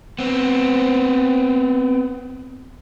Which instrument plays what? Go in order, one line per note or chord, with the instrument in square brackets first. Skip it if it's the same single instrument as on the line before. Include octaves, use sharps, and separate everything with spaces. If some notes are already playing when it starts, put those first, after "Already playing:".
[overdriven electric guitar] B3 C4